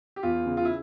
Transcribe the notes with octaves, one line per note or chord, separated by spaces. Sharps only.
G4
E2 F4
C#3
F4
E4